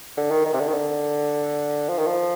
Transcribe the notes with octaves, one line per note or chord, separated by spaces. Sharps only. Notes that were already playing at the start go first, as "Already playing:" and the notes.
D3
D#3
D#3
C3
D3
D#3
D3
F3
D#3
F3